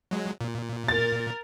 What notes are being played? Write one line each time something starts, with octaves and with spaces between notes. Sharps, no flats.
F#3 G#3
A#2
A#4 A6